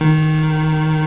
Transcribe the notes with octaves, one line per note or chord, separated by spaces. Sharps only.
D#3